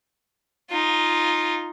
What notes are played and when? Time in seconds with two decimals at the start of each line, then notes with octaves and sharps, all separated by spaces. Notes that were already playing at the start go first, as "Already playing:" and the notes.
0.70 D#4 F4